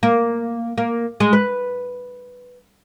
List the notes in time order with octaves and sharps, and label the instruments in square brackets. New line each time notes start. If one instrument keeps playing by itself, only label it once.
[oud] A#3
A#3
G#3
B4